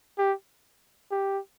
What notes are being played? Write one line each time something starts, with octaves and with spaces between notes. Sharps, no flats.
G4
G4